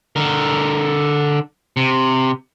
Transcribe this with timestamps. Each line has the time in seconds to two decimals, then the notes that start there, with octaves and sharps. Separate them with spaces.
0.16 D3 A#4
1.77 C3